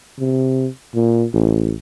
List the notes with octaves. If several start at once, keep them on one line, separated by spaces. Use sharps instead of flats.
C3
A#2
A1